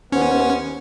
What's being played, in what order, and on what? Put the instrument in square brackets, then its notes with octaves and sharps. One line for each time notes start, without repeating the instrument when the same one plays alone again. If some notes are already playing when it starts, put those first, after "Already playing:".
[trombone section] D#2 B3 C5 [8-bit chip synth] C#4